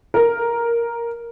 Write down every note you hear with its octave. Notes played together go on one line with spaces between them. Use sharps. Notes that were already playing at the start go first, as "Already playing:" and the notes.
A#4